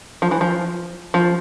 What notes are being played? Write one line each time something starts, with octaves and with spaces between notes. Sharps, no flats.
F3
E3
F3
F3